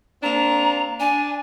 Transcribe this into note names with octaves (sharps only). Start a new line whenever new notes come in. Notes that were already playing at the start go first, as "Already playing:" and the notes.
A#3 C4 D4 A#5
D4 G#5